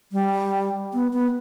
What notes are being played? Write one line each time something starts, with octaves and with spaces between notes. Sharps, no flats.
G3
B3
B3